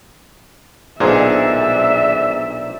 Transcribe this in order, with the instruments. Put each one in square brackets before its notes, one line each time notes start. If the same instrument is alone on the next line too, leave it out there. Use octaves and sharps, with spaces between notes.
[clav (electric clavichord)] B1 A#2 [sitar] D3 [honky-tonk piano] G#4 A#4 C5 [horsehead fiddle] D5 E5